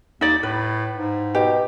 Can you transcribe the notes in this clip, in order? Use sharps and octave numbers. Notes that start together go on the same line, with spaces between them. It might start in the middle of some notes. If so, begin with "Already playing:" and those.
D#2 D#4 D5
A2 B4
G#2
B2 G4